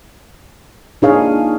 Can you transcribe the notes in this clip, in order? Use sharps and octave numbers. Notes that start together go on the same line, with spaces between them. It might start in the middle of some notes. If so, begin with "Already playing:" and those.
A#2 D4 D#4 G#4 C#5 F5